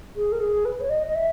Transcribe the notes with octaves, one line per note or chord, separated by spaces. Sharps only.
G#4
A#4
G#4
B4
C#5
D#5
D#5
E5